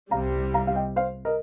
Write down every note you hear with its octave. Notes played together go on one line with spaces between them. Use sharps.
C2 C3 G3 F5 A#5
F5 A#5
F5
D#5 G5
C5 F5
A#4 D#5